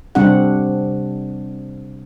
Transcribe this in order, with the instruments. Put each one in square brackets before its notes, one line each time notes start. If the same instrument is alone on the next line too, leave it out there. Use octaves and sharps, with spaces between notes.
[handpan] C3 G3 C4 D4 G4 F#5